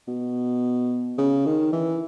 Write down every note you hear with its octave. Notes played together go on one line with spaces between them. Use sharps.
B2
C#3
D#3
E3